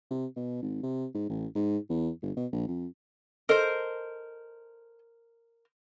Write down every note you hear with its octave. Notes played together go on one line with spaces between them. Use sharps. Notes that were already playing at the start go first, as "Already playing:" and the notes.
C3
B2
G#1
C3
G#2
A1
G#2
E2
G1
B2
A#1
F2
A4 A#4 C5 D#5